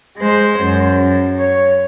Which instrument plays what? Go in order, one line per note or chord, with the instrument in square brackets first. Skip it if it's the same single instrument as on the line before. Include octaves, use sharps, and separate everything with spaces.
[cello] G#3 C5
F#2
C#5